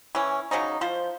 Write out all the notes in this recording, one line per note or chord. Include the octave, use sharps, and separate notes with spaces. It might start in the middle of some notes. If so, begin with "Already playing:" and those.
E3 C#4
C#3 F#3 C#4 D#4
F3 C5